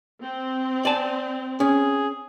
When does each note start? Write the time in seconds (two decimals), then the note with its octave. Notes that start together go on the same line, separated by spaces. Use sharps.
0.22 C4
0.85 D5 G#5 A5
1.60 C#4 G#4